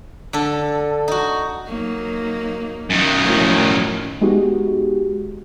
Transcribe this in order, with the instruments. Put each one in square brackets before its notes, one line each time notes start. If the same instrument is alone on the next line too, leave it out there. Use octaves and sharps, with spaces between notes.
[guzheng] D3 A4
D#4 F#4
[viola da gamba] F#3 A#3 D#4
[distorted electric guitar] F#2 D#3
[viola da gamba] A2 F3 F#4
[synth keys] G#3 B3 D#4 F#4 G4